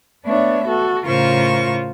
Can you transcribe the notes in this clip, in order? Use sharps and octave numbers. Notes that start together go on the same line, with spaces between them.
A3 B3 D4 C#5 E5
F#4 A4
A2 C#3 F4 A#4 C5 C#6